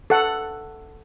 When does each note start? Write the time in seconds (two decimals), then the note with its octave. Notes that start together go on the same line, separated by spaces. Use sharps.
0.10 A4 F#5